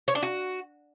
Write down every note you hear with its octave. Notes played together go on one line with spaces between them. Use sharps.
C#5
D4
F#4